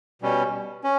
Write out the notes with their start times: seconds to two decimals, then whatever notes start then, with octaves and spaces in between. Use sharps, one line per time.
0.22 B2 G3 C#4
0.84 C#4